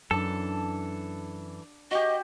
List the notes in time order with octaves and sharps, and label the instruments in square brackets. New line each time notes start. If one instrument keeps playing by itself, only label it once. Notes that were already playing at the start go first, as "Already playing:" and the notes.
[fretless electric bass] F#2 [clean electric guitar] E3 A4 [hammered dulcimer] D4 A5
[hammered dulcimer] F#4 G4 [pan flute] D#5